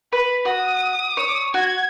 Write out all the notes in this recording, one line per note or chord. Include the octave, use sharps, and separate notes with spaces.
B4 B5
F#4 D#6
C#5
F#4 G#6